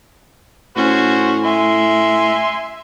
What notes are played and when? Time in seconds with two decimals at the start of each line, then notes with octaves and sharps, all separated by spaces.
0.77 A2 C#4 F#4 C5
1.44 E5 G#5 C6